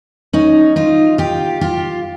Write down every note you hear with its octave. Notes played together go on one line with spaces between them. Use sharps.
C#4 D#4
D#4 F4
F4 G4
F4 G4